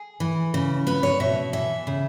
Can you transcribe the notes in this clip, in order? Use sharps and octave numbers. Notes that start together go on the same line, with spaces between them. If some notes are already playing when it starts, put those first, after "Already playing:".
Already playing: G#4
E3
C#3
B3 B4
C#5
B2 E5
E3 E5
C#3